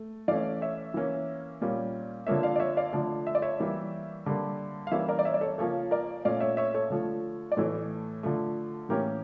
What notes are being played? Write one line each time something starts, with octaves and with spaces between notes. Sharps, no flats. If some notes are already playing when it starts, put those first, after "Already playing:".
Already playing: A3
E3 A3 C#4 D5 F5
C#5 E5
E3 A#3 C#4
A#2 G3 A#3 C#4
D3 F3 A#3 C#5 E5
D5 F5
D5
C#5 E5
D5 F5
D3 F3 A3
E5
D5
C#5 E5
E3 G3 A#3
D3 G3 A#3
F5
E3 G3 A#3 C#4 C#5 E5
A#4 D5
D5
C#5 E5
D5
A4 C#5
C#3 F3 A#3 C#4 A4 C#5
A#4 D5
A#2 A3 C#4 D5 F5
C#5 E5
C#5 E5
A4 C#5
D3 F3 A3
D5
A2 E3 A3 A4 C#5
D3 F3 A3
A2 E3 A#3 C#4 G4 A#4